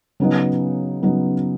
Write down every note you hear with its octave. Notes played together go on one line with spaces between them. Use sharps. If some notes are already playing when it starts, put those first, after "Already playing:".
C#3 F#3 B3 D#4
C#3 F#3 B3 D#4